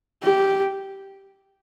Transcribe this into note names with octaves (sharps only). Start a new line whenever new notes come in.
G4